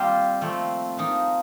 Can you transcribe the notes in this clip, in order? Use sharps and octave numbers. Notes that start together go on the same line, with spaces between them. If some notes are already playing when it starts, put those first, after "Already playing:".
Already playing: G3 A#3 C4 F4 C5
F3 A3 C4
F3 A#3 D#4